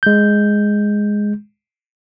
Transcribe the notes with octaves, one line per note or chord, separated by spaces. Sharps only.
G#3 G6